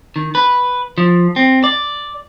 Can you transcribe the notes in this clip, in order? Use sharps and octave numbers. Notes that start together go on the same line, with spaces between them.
D#3
B4
F3
C4
D5